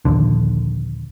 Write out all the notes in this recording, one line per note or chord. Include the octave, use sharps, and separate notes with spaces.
A#1 D#2 D3